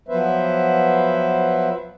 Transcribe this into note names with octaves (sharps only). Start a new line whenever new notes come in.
F3 F#3 B3 B4 C5 E5